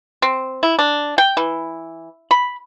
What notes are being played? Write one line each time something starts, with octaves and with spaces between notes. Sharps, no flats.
C4
E4
D4
G5
E3
B5